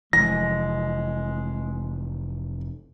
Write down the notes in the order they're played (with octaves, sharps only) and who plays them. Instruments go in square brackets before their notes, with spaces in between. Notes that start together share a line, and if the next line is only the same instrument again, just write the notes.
[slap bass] F1 E3 [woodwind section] G#3 [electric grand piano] A#6